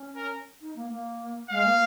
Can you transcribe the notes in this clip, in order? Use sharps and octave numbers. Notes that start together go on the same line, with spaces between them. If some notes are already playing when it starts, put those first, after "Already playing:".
Already playing: C#4
A#4
D#4
A#3
A#3
G#3 F5
A#3